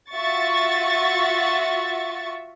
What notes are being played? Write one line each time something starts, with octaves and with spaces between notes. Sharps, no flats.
F4 F#4 E5 C#6 A6